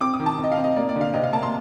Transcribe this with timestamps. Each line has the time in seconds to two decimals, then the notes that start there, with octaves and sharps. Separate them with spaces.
0.01 C4 D6
0.14 D#6
0.20 D#3
0.26 A5
0.38 C4
0.44 D#5
0.52 F5
0.58 C4
0.64 D#5
0.76 A#3 D5
0.89 D5
0.96 D3
1.01 F5
1.14 C3 D#5
1.24 F5
1.33 A#3 A5
1.43 C6